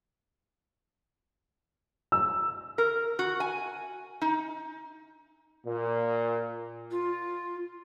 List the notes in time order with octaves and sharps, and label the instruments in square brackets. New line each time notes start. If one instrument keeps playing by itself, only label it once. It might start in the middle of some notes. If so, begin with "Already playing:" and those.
[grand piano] E6
[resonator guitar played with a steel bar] A#4
F#4
G#5
D#4
[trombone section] A#2
[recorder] F4